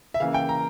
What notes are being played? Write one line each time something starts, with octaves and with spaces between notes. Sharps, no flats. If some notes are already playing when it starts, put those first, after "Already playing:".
E5
C#3 E3 A#3 F5
G5
A#5